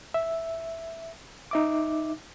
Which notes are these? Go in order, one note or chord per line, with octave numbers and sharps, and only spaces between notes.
E5
D#4 E5 D6